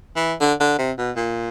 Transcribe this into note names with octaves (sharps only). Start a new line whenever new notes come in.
E3
D3
D3
C3
B2
A#2